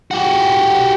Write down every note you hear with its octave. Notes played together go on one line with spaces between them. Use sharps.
F#4 G4